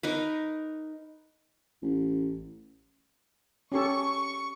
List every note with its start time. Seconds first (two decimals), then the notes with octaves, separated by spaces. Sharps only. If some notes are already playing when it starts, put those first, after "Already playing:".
0.03 D#4 A#4 B4
1.82 A1
3.72 C#4 G4 A4 C#6